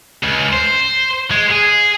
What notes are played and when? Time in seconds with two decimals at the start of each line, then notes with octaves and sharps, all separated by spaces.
0.23 C#2
0.52 C5
1.31 G#3
1.51 G#4